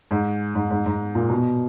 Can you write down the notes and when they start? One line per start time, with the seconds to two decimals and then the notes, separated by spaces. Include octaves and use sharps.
0.11 G#2
0.55 G#2
0.70 G#2
0.86 G#2
1.15 A#2
1.29 B2